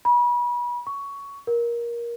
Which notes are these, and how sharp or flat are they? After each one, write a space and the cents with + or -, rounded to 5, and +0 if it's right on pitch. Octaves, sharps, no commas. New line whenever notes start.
B5 -35
C#6 +15
A#4 +15